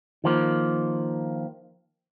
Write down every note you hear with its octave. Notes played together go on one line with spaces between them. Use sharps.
D#3 F3 A#3